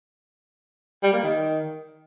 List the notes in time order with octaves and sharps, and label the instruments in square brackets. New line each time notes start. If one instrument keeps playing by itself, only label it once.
[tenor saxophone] G3
A#3
D#3